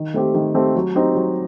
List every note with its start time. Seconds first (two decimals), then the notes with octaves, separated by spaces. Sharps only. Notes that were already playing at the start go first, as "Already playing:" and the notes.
Already playing: D#3
0.14 A3 C4 G4
0.34 D#3
0.55 A3 C4 G4
0.75 F#3
0.95 C4 D#4 G4
1.15 F#3